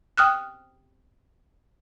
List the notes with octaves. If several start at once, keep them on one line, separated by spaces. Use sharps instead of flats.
G5 D#6 F6 F#6